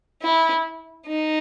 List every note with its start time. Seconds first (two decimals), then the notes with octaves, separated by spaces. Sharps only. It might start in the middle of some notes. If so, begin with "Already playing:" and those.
0.22 E4
1.06 D#4